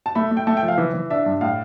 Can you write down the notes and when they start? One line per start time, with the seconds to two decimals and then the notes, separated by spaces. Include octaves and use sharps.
0.06 A5
0.15 A3 B5
0.31 A3
0.37 G5
0.47 A3 A5
0.57 G5
0.63 F3
0.68 F5
0.78 E3 E5
0.94 E3
1.10 D4 E5
1.26 G2
1.41 A2 F5